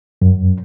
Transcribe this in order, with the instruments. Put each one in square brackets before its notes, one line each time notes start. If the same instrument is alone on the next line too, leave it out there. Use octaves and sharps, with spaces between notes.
[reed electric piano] F#2